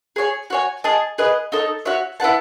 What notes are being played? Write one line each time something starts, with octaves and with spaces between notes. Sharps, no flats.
G#4 C#5 G#5
F#4 C#5 G#5
G#4 D#5 A5
G#4 B4 D#5
D#4 A4 C#5
F#4 C#5 E5
E4 B4 F#5 A5